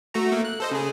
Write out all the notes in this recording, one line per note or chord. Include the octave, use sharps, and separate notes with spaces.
A3 F#4 A#5
A3 A#3
F#6
A4 C5 D#5
C#3 G#4